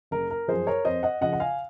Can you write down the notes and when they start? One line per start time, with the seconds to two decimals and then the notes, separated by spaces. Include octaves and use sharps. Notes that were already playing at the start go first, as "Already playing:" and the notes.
0.11 F#1 A#4
0.31 A#4
0.48 F#2 F3 G#4 C5
0.67 A#4 C#5
0.85 F2 C5 D#5
1.03 D#5 F#5
1.21 C#3 F3 D#5 F#5
1.33 F#5
1.40 F5 G#5